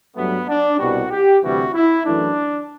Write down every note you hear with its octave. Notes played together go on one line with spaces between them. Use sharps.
G2 F#3 A3 B3
D4
C2 B2 G3 F#4
G4
D2 C3 E3 G3 F#4
E4
F#2 E3 A3 D4